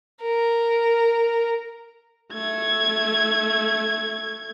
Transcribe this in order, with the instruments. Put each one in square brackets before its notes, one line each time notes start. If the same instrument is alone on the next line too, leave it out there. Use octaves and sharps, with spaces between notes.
[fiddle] A#4
[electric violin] A3 G#6